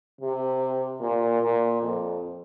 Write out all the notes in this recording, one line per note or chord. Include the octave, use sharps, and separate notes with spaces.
C3
A#2
A#2
F2